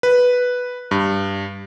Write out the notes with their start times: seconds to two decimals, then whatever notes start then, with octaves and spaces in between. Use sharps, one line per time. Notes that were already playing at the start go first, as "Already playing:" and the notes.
0.03 B4
0.91 G2